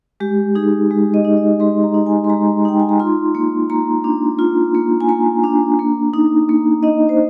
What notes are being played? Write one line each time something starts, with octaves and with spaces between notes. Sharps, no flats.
G#3 G4
D#4 G#4
G#3
D#5
D#4
D#5
G#3 C6
A#5
D#4
G#5
C6
G#3 A#5
D#4 G5
G#5
A#5
F4 C6
A#3
A#3 A#5
D4
F4
A#3
G#5
A#3 A#5
D4
A#3
D#4
A#3
D#4 D#5
C5